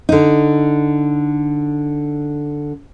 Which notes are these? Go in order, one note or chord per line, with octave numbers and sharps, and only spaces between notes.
D3 D#4